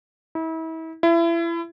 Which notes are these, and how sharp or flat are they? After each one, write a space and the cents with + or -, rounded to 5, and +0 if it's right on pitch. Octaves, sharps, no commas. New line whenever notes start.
E4 -35
E4 +30